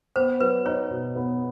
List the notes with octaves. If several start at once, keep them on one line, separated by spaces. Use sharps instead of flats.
B3 C5
F#3 B4
D#4 C#5
B2
B3